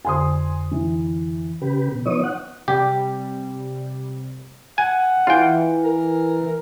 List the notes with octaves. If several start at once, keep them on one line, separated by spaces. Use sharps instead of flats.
F2 D3 C5 G#5 C6 D#6
E3
C#3 G4 B4
B2
F3 B3 D#4 C#5 D#6
F#5
C3 G3 G4
F#5 G#5
E3 F4 G5
A#4